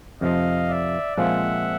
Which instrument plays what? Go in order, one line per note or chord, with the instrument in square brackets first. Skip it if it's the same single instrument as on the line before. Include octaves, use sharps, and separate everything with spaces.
[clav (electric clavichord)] F2 C3 F3 [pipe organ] D#5 F5
[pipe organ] D5 E5
[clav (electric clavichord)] A#2 F3 G#3 C4 F4 [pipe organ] E5 F#5